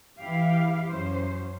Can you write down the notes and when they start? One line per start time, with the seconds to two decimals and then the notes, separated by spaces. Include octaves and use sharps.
0.21 E3 E4 G4 F5
0.89 F#2 C#4 C5